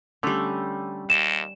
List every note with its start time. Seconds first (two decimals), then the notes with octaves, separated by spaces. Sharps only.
0.23 D3 G3 A3 C#4
1.10 D#2 E7